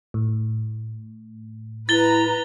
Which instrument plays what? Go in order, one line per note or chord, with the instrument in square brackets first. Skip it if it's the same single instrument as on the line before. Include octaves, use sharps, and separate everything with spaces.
[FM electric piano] A2
[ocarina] E4 [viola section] B4 A#5 [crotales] A6 G7